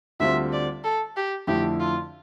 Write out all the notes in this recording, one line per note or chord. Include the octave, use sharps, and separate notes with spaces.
D2 D3 G3 C4 F4 E5
D5
A4
G4
F2 D3 A3 E4 G4
F4